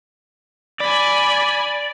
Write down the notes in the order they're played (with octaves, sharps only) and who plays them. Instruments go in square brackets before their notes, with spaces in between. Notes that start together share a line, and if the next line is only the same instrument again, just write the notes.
[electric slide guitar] D5 [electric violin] G#5 B5